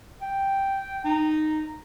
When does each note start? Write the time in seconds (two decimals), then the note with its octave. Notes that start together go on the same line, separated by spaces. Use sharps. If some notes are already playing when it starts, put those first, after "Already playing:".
0.22 G5
1.04 D#4